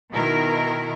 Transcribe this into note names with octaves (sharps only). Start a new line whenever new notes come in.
B2 D#3 E4 A#4